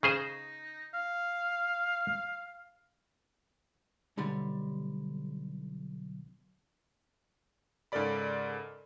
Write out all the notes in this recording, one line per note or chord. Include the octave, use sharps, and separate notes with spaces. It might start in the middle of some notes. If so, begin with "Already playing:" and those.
C#3 D#4 G#4 C5
F5
B1 D3 G3
G#2 C#3 A4 A#4 D5 B5